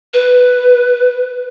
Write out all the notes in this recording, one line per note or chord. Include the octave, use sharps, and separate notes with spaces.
B4